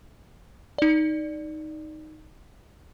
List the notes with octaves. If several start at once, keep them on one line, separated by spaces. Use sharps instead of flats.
D#4 D5